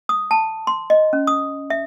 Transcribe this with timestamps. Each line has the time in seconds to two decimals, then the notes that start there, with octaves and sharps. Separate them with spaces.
0.09 D#6
0.31 A5
0.67 C6
0.90 D#5
1.13 C#4
1.27 D#6
1.70 E5